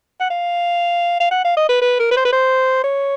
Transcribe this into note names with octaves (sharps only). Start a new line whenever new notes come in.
F#5
F5
F5
F#5
F5
D#5
B4
B4
A#4
B4
C5
B4
C5
C#5